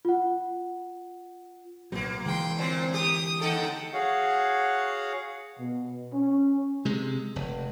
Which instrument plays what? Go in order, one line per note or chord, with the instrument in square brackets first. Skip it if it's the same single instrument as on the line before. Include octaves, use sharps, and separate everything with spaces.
[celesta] F4 F#5
[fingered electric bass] C2 A#2 F#3 [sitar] A#3 B3
[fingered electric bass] D3 E3 G#3 [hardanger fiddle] G5 C6
[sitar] A#2 [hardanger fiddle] C4 C5
[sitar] G4 [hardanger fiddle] D#6
[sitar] D#2 D#4 A4 [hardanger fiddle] F#5 G5
[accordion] F#4 G#4 C#5 F5 F#5
[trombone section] B2
C#4
[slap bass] C3 G#3
F1